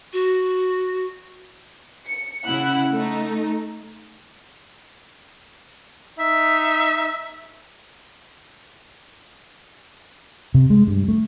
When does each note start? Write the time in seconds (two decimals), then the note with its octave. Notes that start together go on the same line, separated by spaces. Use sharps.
0.13 F#4
2.06 C#7
2.46 C#3 E4 F#5 F#6
2.94 A3 D#4
6.19 D#4 E5
10.54 C3
10.70 G#3
10.87 G2
11.08 A3